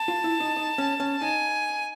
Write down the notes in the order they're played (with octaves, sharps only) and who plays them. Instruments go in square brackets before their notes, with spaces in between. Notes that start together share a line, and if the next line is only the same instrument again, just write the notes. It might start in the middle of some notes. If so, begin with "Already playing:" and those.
Already playing: [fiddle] A5
[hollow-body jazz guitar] F4
E4
D#4
D#4
C#4
C#4
[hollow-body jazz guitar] D#4 [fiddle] G#5